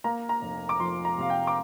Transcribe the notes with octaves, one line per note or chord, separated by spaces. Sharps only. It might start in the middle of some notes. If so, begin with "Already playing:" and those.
A#3 A#5
A#5
F1
D6
F2 C6
A#5
C3 F5
G5
D6